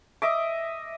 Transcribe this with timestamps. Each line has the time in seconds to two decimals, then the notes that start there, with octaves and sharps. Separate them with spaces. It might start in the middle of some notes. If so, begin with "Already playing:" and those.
0.22 D#5 E5 D6